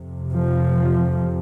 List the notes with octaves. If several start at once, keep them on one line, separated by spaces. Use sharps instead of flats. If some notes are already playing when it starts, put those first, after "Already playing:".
Already playing: F2 C3
F3